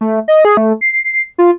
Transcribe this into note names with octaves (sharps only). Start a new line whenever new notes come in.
A3
D#5
G#4
A3
C7
F4